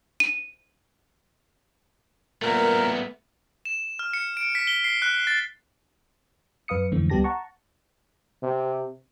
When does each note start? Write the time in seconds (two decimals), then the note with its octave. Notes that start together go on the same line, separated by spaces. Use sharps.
0.20 D#7
2.42 A#2 A3 B3 A#4
3.65 E7
3.99 F6
4.14 C#7
4.37 D7
4.55 B6
4.67 G7
4.84 C7
5.02 F#6
5.27 A6
6.68 F#2 B4 F5 D#6 C#7
6.92 F2 G#2 D3 E3 A3 C4
7.10 C#2 G3 B3 G4 A5 A#6
7.24 F#5 A5 A#5 C#6
8.43 C3